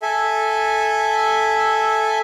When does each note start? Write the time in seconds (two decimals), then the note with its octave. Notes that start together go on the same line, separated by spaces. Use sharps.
0.02 A4 E5 G#5